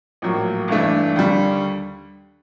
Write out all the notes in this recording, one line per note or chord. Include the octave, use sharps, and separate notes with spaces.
A#1 A2 F#3 A#3
G#1 G2 E3 A3 D4
D#2 D3 G3